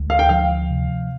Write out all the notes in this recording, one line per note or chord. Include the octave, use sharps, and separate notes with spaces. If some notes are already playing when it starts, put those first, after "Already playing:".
Already playing: D2 G#3
F5
G5
F3 F5
C3